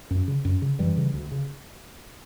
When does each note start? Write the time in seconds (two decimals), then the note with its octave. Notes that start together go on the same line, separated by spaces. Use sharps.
0.11 F#2
0.28 C#3
0.45 F#2
0.62 C#3
0.79 F#2 E3 G3
0.97 C#3
1.14 D2
1.32 C#3